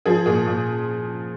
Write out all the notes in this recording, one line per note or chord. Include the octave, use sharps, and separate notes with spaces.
F3 G#4
A#2 G#4
A#2